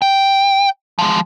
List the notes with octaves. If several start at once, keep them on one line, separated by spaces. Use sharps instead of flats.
G5
F3 G#3